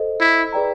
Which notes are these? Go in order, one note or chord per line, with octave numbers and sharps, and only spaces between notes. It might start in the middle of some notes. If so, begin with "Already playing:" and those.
Already playing: A4 C5 D#5
E4
G#4 B4 D5 G5 A#5